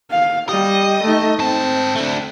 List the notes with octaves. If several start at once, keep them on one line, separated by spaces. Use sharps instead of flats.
F5
G3 D#5
A3 D#4
G#2 C4 A5
A3 D4